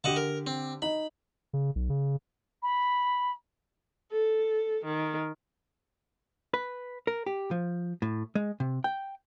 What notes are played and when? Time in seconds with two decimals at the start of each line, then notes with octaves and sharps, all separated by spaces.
0.04 D3 G4 D#5 F#5 A5
0.16 A#4
0.47 C4
0.82 D#4 B5
1.53 C#3
1.75 B1
1.90 C#3
2.63 B5
4.11 A4
4.84 D#3
6.54 B4
7.07 A#4
7.26 G4
7.51 F3
8.02 A2
8.35 G#3
8.60 C3
8.84 G5